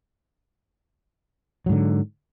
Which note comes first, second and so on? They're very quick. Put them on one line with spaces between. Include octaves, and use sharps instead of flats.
F#3 G#2 D3